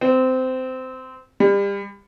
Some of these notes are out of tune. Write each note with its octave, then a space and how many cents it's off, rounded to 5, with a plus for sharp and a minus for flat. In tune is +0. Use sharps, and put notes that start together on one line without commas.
C4 -20
G3 +30